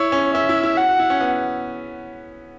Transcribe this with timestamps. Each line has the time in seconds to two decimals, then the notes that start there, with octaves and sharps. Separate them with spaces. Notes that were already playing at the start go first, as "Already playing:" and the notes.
Already playing: E4 C#5
0.12 C#4
0.34 C#4 E5
0.49 E4
0.63 E4
0.77 F#4 F#5
0.89 F#4
0.99 E4
1.10 C#4
1.21 B3